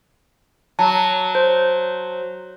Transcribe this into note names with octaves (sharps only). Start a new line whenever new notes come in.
F#3 A5
C5